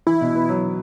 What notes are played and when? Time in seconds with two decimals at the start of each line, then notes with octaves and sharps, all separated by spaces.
0.07 E3 E4
0.21 B2
0.35 B3
0.49 F#3